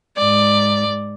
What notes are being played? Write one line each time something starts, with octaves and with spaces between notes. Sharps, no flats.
G#2 D5